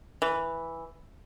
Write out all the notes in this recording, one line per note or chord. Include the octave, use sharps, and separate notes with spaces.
E3